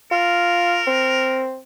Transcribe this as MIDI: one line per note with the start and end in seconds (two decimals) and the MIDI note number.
0.12 0.81 65
0.12 1.44 70
0.87 1.60 60